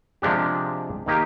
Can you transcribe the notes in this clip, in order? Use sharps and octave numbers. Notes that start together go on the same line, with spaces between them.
C3 F3 G#3 D4 G4
D#3 A#3 D#4 G4